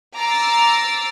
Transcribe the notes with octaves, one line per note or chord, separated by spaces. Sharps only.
A#5 D6 E6 A6 C7